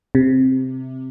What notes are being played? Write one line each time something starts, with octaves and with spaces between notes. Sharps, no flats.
C3